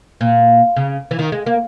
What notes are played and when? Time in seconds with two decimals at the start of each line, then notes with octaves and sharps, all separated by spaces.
0.21 A#2
0.76 C#3
1.11 E3
1.19 D#3
1.32 G#3
1.46 A#3